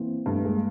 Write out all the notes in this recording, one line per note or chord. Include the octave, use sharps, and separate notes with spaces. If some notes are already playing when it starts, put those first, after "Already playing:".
Already playing: E3 A#3 C4
G2 A3 B3
G#3 A#3